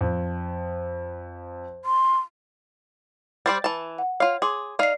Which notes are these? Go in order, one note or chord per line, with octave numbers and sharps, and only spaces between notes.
F2
C6
G3 C5 D5 A6
E3 A5
F#5
F4 C#5 F5
G#4 C6 D6
D#4 D5 F5 C7